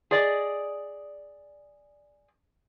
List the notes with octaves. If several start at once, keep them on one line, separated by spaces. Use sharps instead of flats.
G#4 D5 D#5